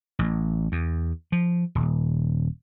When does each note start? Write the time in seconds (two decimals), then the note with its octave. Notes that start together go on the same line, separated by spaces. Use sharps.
0.19 A1
0.72 E2
1.32 F3
1.75 D#1